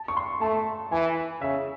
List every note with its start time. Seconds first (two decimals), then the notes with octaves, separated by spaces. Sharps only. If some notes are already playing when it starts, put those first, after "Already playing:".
Already playing: A5
0.08 C#6
0.17 C6
0.41 A3 A5
0.92 E3 G#5
1.41 C#3 E5